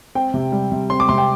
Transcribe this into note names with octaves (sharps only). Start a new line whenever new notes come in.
C4 G5
C3
G3
C3
C4 C6
D6
C3 C6
G5